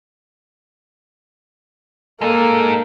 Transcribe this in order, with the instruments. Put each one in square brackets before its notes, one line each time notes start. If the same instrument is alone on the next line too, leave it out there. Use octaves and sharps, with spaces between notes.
[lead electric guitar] G#3 D#4 [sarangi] A#3 [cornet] A4